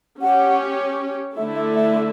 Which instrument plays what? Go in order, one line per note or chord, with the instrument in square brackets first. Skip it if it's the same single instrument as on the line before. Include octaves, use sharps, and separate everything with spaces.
[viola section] C#4 G4 C#5 [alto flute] F#5
[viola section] D3 A3 E4 A4 [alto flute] E5
[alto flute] E5
E5